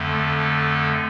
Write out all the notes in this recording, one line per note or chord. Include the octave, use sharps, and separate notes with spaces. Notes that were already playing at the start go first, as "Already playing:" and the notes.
Already playing: F2 D3 A3